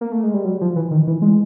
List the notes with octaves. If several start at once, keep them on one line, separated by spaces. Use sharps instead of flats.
A#3
A3
G#3
G3
F#3
F3
E3
D#3
E3
G#3